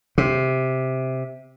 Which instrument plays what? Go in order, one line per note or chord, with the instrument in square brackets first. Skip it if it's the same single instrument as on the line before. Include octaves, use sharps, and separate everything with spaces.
[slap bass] C3